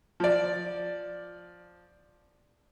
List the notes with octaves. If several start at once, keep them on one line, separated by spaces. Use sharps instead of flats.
F3 D5